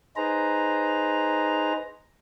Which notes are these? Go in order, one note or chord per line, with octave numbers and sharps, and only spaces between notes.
D#4 G#4 B4 C5 A#5